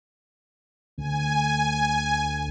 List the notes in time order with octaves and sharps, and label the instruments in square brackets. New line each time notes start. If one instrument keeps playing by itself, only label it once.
[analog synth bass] D2 [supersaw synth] G#5